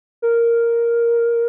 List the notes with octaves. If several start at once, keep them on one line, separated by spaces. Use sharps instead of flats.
A#4